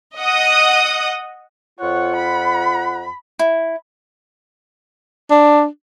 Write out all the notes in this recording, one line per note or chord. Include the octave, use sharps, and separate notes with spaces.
D#5 F#5 D#6
F2 F4 C#5 F#5
B5
E4
D4